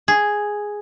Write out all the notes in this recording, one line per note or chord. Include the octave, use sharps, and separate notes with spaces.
G#4